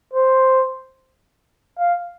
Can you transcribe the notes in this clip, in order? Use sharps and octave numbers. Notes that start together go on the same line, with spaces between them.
C5
F5